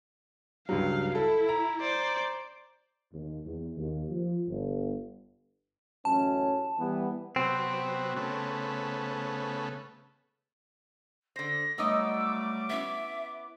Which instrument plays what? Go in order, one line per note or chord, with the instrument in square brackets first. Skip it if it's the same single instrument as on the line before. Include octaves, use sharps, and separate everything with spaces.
[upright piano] C#2 G2 F#3 [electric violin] F5
[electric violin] E4 [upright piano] A4
[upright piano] A#5
[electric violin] C5 D5
[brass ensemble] D#2
E2
D#2
F3
G1
[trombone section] A1 F#2 C#4 [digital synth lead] A5
[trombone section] E3 G3 B3
[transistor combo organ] C3 F#3 B3 [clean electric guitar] C4
[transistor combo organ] C#3 A3 B3
[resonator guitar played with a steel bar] D3 C5 [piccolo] A#6
[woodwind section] F#3 G3 A3 [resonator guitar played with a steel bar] B3 D#4 D#5 [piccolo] D6 [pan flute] E6
[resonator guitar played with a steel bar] B3 C#4 E4 [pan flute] E5